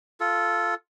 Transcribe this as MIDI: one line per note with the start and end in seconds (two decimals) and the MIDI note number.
0.20 0.74 65
0.20 0.74 69